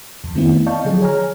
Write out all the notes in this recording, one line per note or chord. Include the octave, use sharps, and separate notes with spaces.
F2
D#3 A3 B3 C4 E4
D5 D#5 F5 A5 C#6 G6
D3 F3 F#3 G#4
G#4 C#5 G#5 A#5 F6